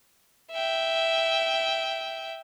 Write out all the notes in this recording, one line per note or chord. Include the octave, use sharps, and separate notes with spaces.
E5 G5